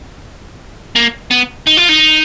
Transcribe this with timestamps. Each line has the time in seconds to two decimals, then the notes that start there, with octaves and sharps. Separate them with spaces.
0.96 A#3
1.31 B3
1.67 D#4
1.77 F4
1.89 D#4